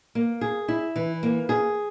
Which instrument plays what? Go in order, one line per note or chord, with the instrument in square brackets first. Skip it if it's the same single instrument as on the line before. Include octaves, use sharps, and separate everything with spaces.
[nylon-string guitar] A#3
G#4
E4
E3
A#3
G#4